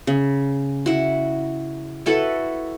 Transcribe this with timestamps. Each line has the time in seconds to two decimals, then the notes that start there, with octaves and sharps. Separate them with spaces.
0.07 C#3
0.86 E4 F#4
2.06 E4 F#4 A4 B4